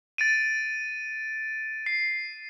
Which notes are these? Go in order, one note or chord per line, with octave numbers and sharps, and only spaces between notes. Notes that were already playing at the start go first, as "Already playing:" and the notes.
A6 D7 D#7
C7